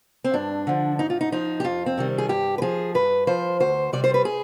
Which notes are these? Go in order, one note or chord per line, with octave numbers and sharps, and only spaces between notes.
C4
G2 D4
D3 F3
G#2 D#4
F4
D#4
F3 D#4
G4
F2 F4
C4
C3 D#3 G3
G#4
G2 G4
B4
F3 G#4
G2 B4
F3 C5
D2 C5
C3 G3 D5
C5
B4
G#4